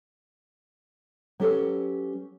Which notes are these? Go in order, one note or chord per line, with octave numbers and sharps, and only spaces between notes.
F#3 C#4 G4 A4 B4 C#5